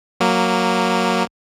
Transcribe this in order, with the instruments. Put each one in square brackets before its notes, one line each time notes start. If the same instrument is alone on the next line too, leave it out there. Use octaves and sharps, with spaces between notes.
[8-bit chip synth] F#3 A#3